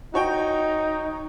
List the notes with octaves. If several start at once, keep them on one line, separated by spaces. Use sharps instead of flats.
D#4 F#4 C#5 G5